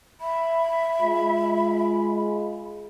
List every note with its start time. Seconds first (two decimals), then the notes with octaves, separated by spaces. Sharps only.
0.21 E5 B5
1.02 G#3 F4